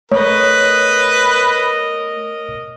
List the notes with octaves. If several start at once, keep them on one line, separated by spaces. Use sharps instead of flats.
A3 A#4 B4 C#5 D#5